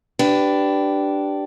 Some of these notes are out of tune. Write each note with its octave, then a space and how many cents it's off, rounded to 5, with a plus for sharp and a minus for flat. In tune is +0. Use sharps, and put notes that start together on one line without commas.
D4 +0 G4 -15 B4 +15